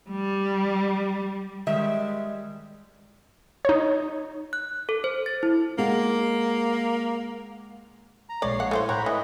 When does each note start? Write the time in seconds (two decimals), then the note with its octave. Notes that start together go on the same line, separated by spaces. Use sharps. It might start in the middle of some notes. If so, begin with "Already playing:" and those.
0.10 G3
1.67 D#3 G3 G#3 E5
3.65 D#4 C#5
4.53 F#6
4.89 A4
5.04 C5
5.26 A6
5.43 E4
5.78 G#3 A#3 F#5
8.29 A#5
8.42 A#1 G#3 C#5 D5 C7
8.60 F#5
8.71 A3 E4 C5
8.89 A2 C#5 F#5 G5 A#5 B5
9.06 E3 D#5